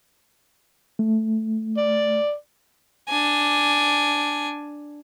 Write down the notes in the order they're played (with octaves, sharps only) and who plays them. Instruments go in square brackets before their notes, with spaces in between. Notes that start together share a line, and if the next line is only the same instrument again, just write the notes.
[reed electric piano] A3
[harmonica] D5
[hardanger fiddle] D4 G#5